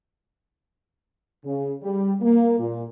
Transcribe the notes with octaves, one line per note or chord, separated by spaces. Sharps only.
C#3
G3
A#3
A#2